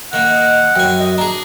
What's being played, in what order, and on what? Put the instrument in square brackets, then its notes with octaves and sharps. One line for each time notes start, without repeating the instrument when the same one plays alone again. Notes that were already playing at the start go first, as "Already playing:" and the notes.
[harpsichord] D#3 A#3 [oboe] F#5
[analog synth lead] D#5
[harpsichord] F#2 G#5 [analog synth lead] G5
[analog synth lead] D#5
[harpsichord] D4 G#4 [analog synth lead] A#5